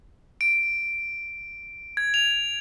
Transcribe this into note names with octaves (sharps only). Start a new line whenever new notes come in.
D7
G#6
F7